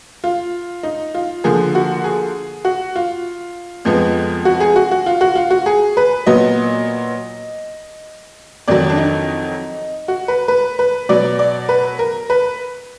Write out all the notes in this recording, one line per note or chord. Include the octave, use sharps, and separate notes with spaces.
F4
D#4
F4
D3 F3 A#3 G#4
F#4
G#4
F#4
F4
F2 F3 G#3 B3
F#4
G#4
F#4
F#4
F4
F#4
F4
F#4
G#4
B4
A#2 F#3 B3 D#5
F2 D#3 F#3 D5
D4
D#4
F#4
B4
B4
B4
B2 F#3 B3 D5
D5
B4
A#4
B4